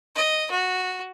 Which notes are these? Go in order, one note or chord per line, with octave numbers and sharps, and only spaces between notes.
D#5
F#4